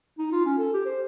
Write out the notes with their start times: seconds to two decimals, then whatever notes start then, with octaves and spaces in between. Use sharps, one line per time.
0.18 D#4
0.32 F4
0.45 C#4
0.58 A4
0.73 G4
0.85 C5